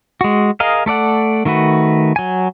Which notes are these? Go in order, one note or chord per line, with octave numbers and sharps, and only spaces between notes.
G#3 F#4
G#4 A#4 D#5 F5
A3 A4 D5 F#5
D#3 A3 F#4 B4
F#3 G#5